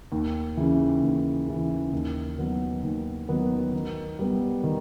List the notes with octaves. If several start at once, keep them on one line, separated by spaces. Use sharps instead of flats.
D#2
C#3 E3
D#2
C#3 E3
D#2
D#3 F#3 B3
D#2
D#3 F#3 B3
D#3
G3 B3
D#3